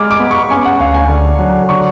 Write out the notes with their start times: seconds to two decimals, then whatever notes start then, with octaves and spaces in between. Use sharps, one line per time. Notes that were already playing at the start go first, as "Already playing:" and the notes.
Already playing: G#3 D6 F6
0.11 D6
0.20 B3
0.31 C#6
0.50 C#4 G#5
0.65 F#5
0.80 D2 F5
0.94 G#5
1.09 D3
1.39 F#3
1.69 D3 C#6